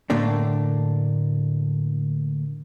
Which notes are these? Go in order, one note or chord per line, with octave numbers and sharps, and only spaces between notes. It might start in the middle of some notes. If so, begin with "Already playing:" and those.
A2 D3 A3 A#3 D4